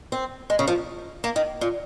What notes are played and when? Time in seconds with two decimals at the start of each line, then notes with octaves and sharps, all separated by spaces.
0.12 C4
0.50 G#3
0.59 C#3
0.68 F3
1.24 A#3
1.36 D#3
1.61 A#2